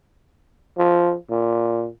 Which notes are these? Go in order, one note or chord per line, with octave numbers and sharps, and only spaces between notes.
F3
A#2